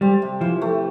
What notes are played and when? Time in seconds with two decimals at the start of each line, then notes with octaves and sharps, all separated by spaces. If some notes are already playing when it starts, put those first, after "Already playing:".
0.01 G3 C4
0.22 C3
0.41 E3 F3
0.62 A3